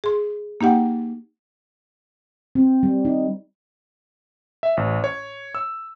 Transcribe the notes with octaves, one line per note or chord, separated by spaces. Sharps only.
G#4 C6
A#3 D#4 G4 F#5 G5
C4
G3
D#4
E5
A1
C#5
E6